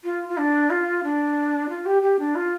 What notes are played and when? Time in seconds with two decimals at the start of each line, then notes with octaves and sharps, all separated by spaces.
0.04 F4
0.29 F4
0.37 D4
0.70 F4
1.04 D4
1.69 F4
1.86 G4
2.02 G4
2.19 D4
2.35 F4